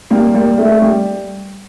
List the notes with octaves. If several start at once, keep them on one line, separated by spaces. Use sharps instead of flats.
G3 A#3
G3 A#3
A3
G3